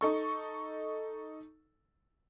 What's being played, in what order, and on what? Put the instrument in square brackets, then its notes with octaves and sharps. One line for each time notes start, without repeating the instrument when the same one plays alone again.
[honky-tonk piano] D#4 A4 C#6